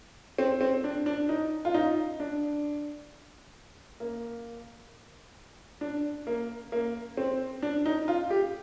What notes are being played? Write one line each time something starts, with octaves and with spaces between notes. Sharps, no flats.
C4
C4
D4
D4
D#4
F4
D#4
D4
A#3
D4
A#3
A#3
C4
D4
D#4
F4
G4